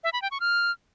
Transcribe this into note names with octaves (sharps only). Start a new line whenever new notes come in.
E5
B5
G5
C#6
F6